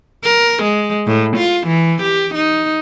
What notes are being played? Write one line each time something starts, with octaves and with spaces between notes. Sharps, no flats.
A#4
G#3
A2
F4
E3
G4
D#4